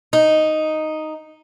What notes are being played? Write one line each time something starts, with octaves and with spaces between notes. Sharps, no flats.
D#4